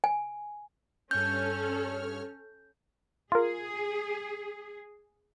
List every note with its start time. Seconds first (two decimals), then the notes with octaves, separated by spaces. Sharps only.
0.04 G#5
1.11 G2 C#4 A4 C#5 F6 G6
3.32 F4 G#4 A#4